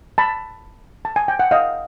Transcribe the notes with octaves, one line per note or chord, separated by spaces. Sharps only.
A5 B5
A5
G#5
G5
F#5
D#5 F5